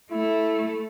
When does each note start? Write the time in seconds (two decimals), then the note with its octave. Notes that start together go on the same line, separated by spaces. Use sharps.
0.11 A3 E4